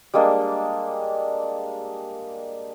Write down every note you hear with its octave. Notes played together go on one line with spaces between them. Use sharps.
G3 G#3 A#3 D4